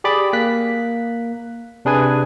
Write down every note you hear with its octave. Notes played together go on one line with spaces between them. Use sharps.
G4 G#4 D5 B5 D6
A#3 F#6 B6
C3 D4 G#4 B4 G#5